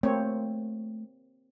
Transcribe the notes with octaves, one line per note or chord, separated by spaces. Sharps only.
A3 A#3 C4 C#5